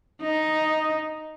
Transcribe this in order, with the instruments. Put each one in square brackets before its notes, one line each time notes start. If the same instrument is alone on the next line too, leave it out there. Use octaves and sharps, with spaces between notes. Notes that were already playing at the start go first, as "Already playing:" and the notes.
[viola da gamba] D#4